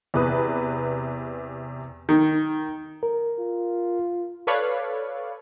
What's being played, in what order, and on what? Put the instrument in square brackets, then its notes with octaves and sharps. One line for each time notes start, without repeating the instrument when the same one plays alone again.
[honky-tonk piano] E2 C3 B4 D#6
[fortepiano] D#3
[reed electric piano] A#4
[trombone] F4
[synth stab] A4 B4 C#5 D5 F5